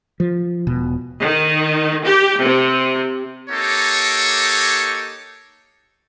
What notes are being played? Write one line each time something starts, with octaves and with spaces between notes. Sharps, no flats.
F3
E1 B2
D#3
G4
C3
A#3 D#4 G4 A4 C#5